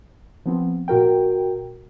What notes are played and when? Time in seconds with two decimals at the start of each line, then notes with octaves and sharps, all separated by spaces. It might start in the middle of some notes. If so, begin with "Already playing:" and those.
0.45 F3 B3 C4
0.88 A#2 F#4 A#4 G5